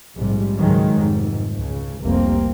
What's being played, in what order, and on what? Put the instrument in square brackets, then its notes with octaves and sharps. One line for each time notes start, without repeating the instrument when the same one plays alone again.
[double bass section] A#1 G#2 C3 G3
C#2 G#2 D#3 F#3 G#3
F1 G#2
C#2 C#3
F1 C2 G3 A#3 C4